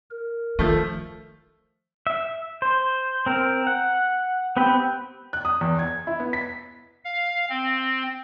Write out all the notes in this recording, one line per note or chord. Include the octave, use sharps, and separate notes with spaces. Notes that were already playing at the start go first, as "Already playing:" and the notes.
A#4
D#3 F3 A3
E5
C5
C4 A#4
F#5
B3 C4 G4 B4
F#6
D#6
E2
G#6
E4
B3
B6
F5
C4